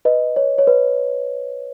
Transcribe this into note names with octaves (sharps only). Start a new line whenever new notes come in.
B4 D#5
C#5
C#5
B4